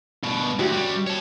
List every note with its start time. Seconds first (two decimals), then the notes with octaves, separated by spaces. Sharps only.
0.23 G2 B2
0.59 D2 F#4 G4
0.72 F#2 G3
1.07 C#5 A5